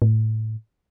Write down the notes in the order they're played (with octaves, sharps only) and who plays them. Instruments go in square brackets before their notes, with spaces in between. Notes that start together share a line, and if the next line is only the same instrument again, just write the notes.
[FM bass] A2